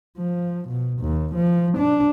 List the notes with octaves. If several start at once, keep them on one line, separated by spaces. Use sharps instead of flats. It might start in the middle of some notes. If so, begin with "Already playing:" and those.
F3
B2
D#2
F3
D4